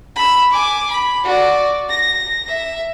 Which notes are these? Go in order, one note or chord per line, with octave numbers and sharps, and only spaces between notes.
B5 E6
G#5 D6
B5
F#4 D5
A#6
E5